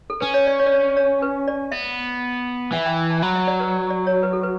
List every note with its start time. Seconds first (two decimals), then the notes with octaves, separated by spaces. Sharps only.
0.10 A4
0.21 C#4 B4
0.34 C#5
0.47 D5
0.60 C#5
0.66 D5
0.72 C#5
0.97 C#5
1.22 B4
1.48 D5
1.72 B3 E5
2.72 E3 F#5
2.86 G5
3.10 A5
3.22 F#3 B5
3.36 E5
3.47 D5
3.60 B4
3.90 D5
4.07 C#5
4.23 B4
4.33 A4
4.43 B4